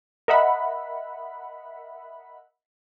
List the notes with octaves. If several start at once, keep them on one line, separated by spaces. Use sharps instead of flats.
A#4 D#5 E5 F#5 B5